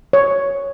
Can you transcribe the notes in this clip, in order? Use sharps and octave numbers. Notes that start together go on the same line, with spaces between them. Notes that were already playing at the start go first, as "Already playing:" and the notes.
C#5